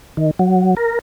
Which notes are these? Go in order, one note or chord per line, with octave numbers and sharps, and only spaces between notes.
D#3
F#3
A#4